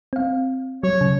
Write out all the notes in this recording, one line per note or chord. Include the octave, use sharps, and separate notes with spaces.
C4 F5
F#3 C#5
C#3